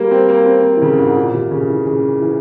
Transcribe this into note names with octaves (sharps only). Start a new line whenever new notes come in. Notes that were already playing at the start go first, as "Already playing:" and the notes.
Already playing: G3 A#3
C4
A#3
C4
A#3
E3
C#3
G#2
A#2
C3
C#3
E3
C#3
E3